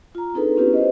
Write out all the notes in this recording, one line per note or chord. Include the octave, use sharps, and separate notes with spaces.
F4 A#5
C4 D4 D#4 G#4 A4 B4
B3 C#4 E4 F4 G4 B4
C5 D#5